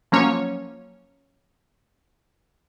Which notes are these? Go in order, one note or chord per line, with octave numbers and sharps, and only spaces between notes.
F3 F#3 A#3 C#4 C#5